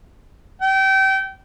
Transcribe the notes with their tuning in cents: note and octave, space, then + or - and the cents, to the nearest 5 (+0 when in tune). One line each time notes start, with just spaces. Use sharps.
G5 -30